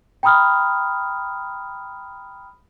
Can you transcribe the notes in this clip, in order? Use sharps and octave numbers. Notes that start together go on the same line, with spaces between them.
G5 A#5 B5 D#6 F6